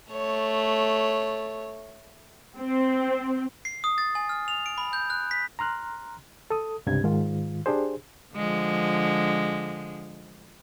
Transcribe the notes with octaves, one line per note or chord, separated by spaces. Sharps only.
A3 C#5
C4
C7
D#6
A6
G#5
F6
F7
D7
B5
G6
F#6
B6
A#5 C6 F6 F#6
A4 D#6
C#2 G2 C3 G3 G#6
G#2 D#3 F4
D4 G4 G#4 C5
D3 F3 G#3